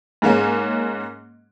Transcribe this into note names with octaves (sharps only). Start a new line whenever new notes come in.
G#2 G#3 A#3 C#4